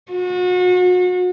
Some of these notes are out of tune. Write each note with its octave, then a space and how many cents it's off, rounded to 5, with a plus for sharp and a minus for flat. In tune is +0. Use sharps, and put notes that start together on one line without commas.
F#4 -35